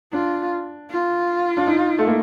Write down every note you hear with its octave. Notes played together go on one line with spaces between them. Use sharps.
D4 F4
F4
D4
D#4
A3
A#3